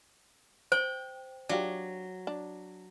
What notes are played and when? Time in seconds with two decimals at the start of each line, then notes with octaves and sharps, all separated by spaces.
0.72 C5 G5
1.49 F#3 D4 F4 G4
2.27 D4